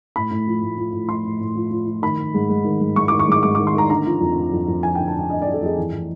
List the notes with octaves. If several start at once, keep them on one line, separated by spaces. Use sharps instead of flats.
A2 B5
A2
F3
A2
F3
A2
F3 C6
A2
A2
F3
F3
F3
D#3 B5
D#3
G#2
G#2
D#3
G#2
G#2 C#6
D6
D#3
C#6
G#2 D6
G#2 D6
D6
D#3
C6
D#3 A#5
D3 A#5
F3
F2
D3
F2
F2
F3 G#5
G5
D3
A5
D3 G5
D3 D#5
D5
F2
A4
F2 G#4
E3
E3